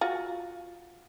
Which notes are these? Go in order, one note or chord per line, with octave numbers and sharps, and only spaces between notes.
F4 F#4